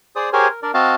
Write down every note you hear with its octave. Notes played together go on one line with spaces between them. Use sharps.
G#4 C5 D5 D#6
G4 G#4 A#4 C5 C#5 G#5
A#4
D4 A#4 D5
C4 F#4 D#5 F5 A5